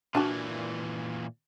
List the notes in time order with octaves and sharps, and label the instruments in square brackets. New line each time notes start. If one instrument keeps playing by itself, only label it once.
[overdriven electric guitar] A#2 E3 [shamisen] D4 F#4 A5